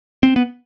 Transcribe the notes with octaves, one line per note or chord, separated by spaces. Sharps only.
C4
B3